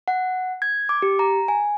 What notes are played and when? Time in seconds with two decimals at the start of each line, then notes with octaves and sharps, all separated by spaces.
0.08 F#5
0.62 G#6
0.89 D6
1.02 G4
1.19 A#5
1.48 G#5